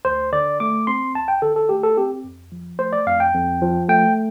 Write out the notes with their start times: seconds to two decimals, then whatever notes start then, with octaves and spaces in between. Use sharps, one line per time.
0.05 D2 C5
0.33 D3 D5
0.60 A3 D6
0.87 C4 C6
1.15 D2 A5
1.28 G5
1.42 D3 A4
1.56 A4
1.69 A3 G4
1.83 A4
1.97 C4 G4
2.24 F2
2.52 F3
2.79 A3 C5
2.93 D5
3.06 F2 F5
3.20 G5
3.34 F2
3.61 F3
3.89 A3 G5